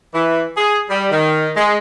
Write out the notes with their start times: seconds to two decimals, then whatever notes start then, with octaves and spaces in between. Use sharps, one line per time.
0.14 E3
0.57 G#4
0.90 G3
1.12 D#3
1.57 G#3